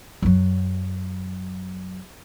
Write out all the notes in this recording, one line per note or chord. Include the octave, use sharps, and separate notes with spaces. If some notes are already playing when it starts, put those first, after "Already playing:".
F#2 F#3